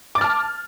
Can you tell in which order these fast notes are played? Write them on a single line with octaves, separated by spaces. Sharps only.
D6 A6 F6 A5